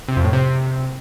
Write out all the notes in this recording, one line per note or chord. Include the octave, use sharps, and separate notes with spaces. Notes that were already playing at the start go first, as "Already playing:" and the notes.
C3
F2
A2
C3